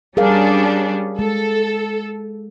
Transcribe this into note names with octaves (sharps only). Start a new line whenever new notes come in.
G3 C#4 D4 G#4 A#4 F5
G#3 A4